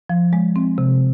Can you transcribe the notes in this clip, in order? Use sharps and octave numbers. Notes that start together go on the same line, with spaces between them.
F3
G#3
C4
C3